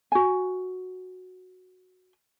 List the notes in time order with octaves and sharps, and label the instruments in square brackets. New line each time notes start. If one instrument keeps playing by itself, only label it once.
[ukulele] F#4 G#5